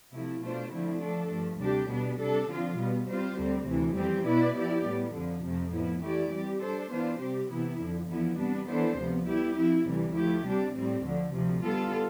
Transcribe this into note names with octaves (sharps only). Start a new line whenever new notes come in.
C3 F3 A3 E4
B2 A3 D4 F4 C5
D3 F3 A3 C4 E4
F3 A3 D4 A4
G2 F3 A3
D2 C3 G3 D4 G4
B2 G3 B3 D4
C3 G3 D4 A4
D3 F3 C4 F4
B2 G3 B3
G3 C4 F4 C5
D2 D3 G3 C4
D2 C3 E3
F2 E3 G3 C4 G4
B2 B3 E4 B4 D5
F3 B3 E4 G4 D5
A2 G3 B3
F2 D3 F3
F2 C3 F3 A3 C4
A2 F3 B3 E4
E3 A3 E4 G4 D5
G3 C4 G4
G3 D4 A4 C5
E3 B3 D4 F4 C5
C3 G3 C4 G4
C3 E3 B3 E4
F2 D3 F3
E2 D3 F3 B3 E4
C3 G3 B3 D4
E3 B3 D4 A4 C5
D2 C3 F3 B3
G3 B3 E4 G4
F3 C4 E4
D2 C3 E3 G3
F3 A3 E4 G4
C3 G3 D4
A2 G3 C4
D2 D3 F3
D2 C3 F3
D3 G3 B3 F4 A4